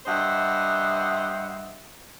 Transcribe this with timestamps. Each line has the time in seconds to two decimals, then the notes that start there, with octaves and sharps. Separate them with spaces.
0.06 G2 C5 D#5 E5 F#5